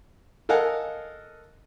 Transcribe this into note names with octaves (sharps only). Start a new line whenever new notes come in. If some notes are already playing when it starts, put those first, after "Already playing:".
A4 A#4 D#5 F5 F#5 G#5